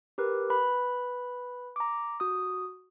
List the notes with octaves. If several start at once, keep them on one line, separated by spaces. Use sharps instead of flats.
G4 A#4 B4
B4 B5
A#5 D6
F#4 D#6